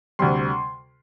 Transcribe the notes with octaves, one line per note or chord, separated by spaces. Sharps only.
D2 C3 G3 C6